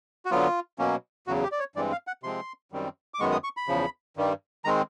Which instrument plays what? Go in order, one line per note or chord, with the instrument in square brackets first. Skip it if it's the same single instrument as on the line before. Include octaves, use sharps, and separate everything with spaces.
[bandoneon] F#4
D3 F#3 B3 F4
B2 F#3 A#3 C#4
E2 C#3 F#3 F#4
G4
D5
C#5
G2 E3 G#3 C4 D5
F5
F#5
C3 F3 G#3 C4 C6
F#2 D#3 G3 C4
D6
F#2 D#3 G#3 B3 C#6
D#6
C#6
B5
E2 C#3 F3
G2 D#3 G3
D#3 G#3 C4 A#5